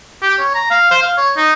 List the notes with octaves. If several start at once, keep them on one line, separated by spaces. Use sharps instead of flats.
G4
C#5
A#5
F5
C5
F5
C#5
D#4